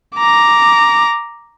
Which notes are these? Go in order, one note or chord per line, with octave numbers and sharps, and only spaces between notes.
A#5 D6